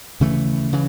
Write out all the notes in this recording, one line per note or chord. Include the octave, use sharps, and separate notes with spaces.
D#2 C#3 E3 A3
C#3 E3